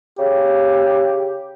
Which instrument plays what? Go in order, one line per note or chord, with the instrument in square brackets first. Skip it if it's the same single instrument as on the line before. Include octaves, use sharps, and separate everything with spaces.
[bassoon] C#3 [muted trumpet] G4